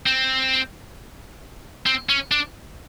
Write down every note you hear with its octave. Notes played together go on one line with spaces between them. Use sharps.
C4
C4
C#4
D4